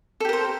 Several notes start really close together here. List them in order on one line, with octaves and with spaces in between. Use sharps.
A4 G4 A#4 C5